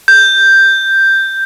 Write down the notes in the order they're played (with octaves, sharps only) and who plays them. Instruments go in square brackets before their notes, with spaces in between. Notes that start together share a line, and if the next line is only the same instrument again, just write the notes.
[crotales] G6